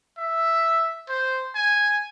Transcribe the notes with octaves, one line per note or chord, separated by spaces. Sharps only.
E5
C5
G#5